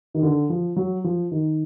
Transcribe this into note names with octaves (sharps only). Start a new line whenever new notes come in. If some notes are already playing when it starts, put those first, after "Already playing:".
D#3
D3
F3
F#3
F3
D#3